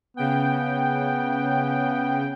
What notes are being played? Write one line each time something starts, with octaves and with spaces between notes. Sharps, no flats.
C#3 B3 G5